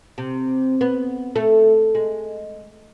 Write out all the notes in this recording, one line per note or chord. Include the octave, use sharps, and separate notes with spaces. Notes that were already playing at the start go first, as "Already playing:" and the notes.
C3
B3
A3
G#3